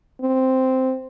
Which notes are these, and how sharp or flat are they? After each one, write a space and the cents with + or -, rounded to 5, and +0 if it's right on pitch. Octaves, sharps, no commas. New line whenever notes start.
C4 -5